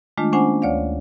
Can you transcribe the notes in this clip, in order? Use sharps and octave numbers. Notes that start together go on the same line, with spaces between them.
D#3 G#3 A3 D4 F4
A#3 C#4 D4 C5 F#5 G#5
D2 C#5 D5 F5